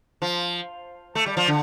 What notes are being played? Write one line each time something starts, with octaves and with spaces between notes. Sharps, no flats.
F3
A3
G3
F3
D3